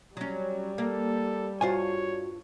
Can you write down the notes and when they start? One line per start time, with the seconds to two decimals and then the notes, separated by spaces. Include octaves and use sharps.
0.17 F#3 G3 C#4
0.78 A#3 A4
1.61 G2 F4 F#4 C5 C#5 G#5